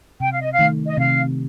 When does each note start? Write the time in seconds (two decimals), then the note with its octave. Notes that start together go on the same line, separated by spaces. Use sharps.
0.20 C3 G5
0.31 F5
0.40 D#5
0.51 F5
0.59 D#3 A3
0.86 D#5
0.97 C3 F5